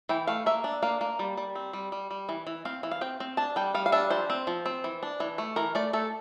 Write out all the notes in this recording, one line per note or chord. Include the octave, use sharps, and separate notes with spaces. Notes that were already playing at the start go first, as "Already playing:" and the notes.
E3 G5
A3 F5
A#3 E5
D4
A#3 F5
A#3
G3
G3
C4
G3
G3
G3
E3
E3
C4 F5
E3
F5
C4 G5
C4
D4 A5
G3 G5
G3 F5
F5
D4 E5
F3 C5
C4
F3
C4
E3
D4
E3
A3
E3 A#4
A3 D5
A3 A4